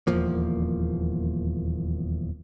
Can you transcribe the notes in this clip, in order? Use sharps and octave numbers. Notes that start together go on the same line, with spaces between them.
D#1 E2 F3 A#3